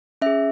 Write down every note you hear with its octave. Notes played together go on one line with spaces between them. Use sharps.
C#4 G#4 E5